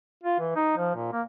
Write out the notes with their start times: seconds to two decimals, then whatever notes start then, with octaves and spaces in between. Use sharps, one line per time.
0.23 F4
0.40 E3
0.56 D#4
0.77 F3
0.95 A#2
1.12 A#3